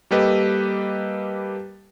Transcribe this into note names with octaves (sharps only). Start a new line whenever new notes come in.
G3 A#3 G4 A4 B4 D#5